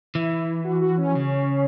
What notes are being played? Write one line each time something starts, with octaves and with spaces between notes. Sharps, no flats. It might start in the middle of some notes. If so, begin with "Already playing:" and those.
E3 E4
F#4
F#4
C#4
C#3